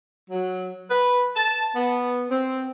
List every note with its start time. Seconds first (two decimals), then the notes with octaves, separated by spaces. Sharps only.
0.30 F#3
0.90 B4
1.36 A5
1.75 B3
2.30 C4